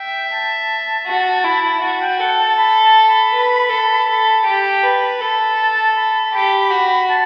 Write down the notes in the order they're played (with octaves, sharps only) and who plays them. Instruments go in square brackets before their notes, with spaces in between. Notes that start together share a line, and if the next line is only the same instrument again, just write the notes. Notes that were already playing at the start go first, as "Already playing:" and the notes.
Already playing: [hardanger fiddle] E5 [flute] G5
[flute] A5
[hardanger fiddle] F#4
E4
[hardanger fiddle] F#4 [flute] A5
[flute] G5
[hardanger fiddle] A4 [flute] F#5
[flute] A5
B5
A5
B5
[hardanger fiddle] B4
A4
A4
G4
[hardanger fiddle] B4 [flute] A5
[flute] A5
[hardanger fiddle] A4 [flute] B5
[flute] B5
A5
B5
[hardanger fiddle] G4 [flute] B5
[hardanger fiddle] F#4
[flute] A5